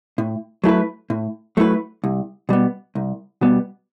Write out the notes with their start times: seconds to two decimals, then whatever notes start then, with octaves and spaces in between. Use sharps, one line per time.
0.18 A2
0.64 F#3 A3 E4 B4
1.10 A2
1.57 F#3 A3 E4 B4
2.04 C2
2.49 B2 G3 B3
2.95 C2
3.41 B2 G3 B3